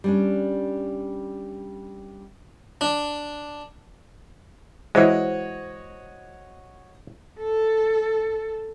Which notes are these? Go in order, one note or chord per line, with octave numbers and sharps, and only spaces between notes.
G3 C#4 D4
D4
E3 G#3 F#4 C5 C#5 D#5
A4